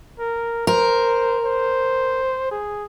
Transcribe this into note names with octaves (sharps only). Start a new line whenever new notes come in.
A#4
A#4 C5
C5
G#4